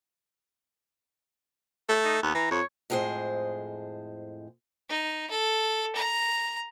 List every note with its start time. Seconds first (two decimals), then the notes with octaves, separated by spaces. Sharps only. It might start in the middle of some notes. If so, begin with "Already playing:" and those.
1.89 A3
2.04 D#4
2.23 D#2 B3
2.35 E3 A#5
2.51 F2 C#5
2.90 F2 A2 G#3 G#4 C5
4.89 D#4
5.30 A4
5.95 A#5